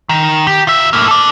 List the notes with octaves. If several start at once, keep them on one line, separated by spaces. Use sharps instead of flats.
D#3
G4
F4 E5
A2 A#3
A4 D5